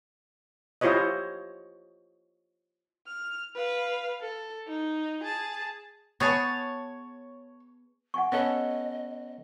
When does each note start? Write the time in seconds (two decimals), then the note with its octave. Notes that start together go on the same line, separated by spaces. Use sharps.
0.81 E4 F4 G4 C5 C#5 D#5
3.07 F6
3.55 B4 F5
4.21 A4
4.69 D#4
5.24 G#4 A5
6.20 B3 G#4 C#5 A5
8.14 F#5 G#5 C#6
8.32 B3 C#4 A4 D#5